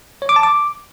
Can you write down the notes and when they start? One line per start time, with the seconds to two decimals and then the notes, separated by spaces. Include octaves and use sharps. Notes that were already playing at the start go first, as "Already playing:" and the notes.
0.22 C#5
0.29 D6
0.36 A5
0.43 D6